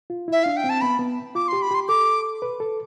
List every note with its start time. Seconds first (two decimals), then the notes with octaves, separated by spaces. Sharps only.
0.10 F4
0.28 E4 E5
0.44 D4 F5
0.57 G5
0.64 C4
0.70 A5
0.81 B3 B5
0.99 B3
1.35 F4 D6
1.48 G4 C6
1.62 B5
1.71 G4 C6
1.88 A4 D6
2.42 B4
2.60 A4